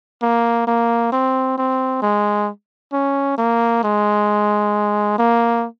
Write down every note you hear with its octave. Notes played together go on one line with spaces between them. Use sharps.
A#3
A#3
C4
C4
G#3
C#4
A#3
G#3
A#3